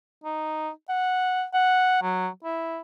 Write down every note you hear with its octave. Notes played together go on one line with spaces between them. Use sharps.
D#4
F#5
F#5
F#3
E4